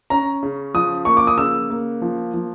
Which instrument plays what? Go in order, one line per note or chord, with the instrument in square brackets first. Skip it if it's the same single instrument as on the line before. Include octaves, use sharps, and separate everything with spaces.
[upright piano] C#4 A#5
C#3
F3 D#6
A#3 C#6
D6
D#6
C#3 E6
A#3
F3
F3